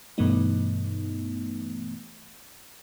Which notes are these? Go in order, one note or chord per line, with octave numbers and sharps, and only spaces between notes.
G2 B2 E3 A3 B3 D#4